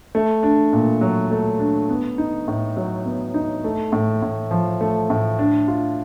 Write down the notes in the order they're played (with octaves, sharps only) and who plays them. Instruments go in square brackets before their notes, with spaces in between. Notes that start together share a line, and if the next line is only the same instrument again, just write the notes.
[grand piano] A3
D4
A#2
F#3
A3
D4
B3
D#4
A2
F#3
B3
D#4
A3
A2
A2
F3
A3
A2
D4
F4